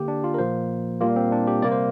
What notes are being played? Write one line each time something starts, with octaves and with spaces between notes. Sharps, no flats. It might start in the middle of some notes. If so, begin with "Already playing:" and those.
Already playing: D3 A#3 G4
D4
F4
A#4
A#2 F3 A#3 C5
A#2 G3 A#3 F4
C4
D4
G4
C3 G3 A#3 D5
C5